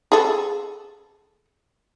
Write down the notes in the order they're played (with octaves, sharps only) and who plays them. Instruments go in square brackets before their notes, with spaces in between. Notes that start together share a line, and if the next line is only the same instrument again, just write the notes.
[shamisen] G#4 A4